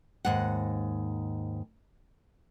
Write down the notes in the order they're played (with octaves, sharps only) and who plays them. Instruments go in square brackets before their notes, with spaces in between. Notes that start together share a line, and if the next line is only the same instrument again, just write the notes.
[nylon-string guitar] D#2 G#2 F#5